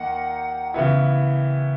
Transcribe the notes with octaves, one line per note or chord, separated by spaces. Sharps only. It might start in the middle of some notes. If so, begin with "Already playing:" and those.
Already playing: D#2 D#3 A#3 F#5
C#3 E3 B3 E4